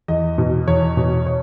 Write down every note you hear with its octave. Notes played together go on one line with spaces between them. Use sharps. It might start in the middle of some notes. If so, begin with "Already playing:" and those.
E2 D#5
B2
E2 C#5
B2
C#5